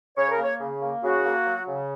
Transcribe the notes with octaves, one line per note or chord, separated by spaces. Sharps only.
C#3 C#5
A#4
A#3
C#5
C#3
A#3
C#3 F#4
A#3
F#3
C#3